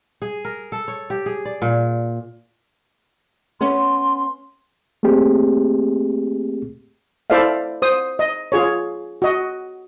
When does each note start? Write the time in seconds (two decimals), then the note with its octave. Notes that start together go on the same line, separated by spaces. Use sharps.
0.22 G#4
0.45 A#4
0.72 A4
0.88 C#5
1.10 G4
1.26 G#4
1.45 D5
1.62 A#2
3.61 B3 C#4 C6
5.03 A3 A#3 C4 G4 G#4
7.30 E4 A4 C5 D5 E5 F5
7.82 C5 D#6
8.19 D#5
8.52 F4 G#4 C#5
9.22 F#4 D#5